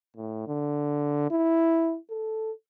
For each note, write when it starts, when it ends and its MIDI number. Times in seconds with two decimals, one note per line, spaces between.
0.16 0.43 45
0.47 1.27 50
1.31 1.97 64
2.10 2.52 69